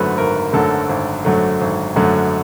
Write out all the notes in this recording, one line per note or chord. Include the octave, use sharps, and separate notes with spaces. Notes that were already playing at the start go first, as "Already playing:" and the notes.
Already playing: G#1 F#2 D3 F#3 A3 B4 C5
G#1 A#4
F#2 D3 F#3 A3 A4
G#1
F#2 D3 F#3 A3
G#1
F#2 D3 F#3 A3